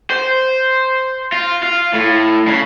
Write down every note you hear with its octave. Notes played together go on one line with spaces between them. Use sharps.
C5
F4
F4
A2
C#3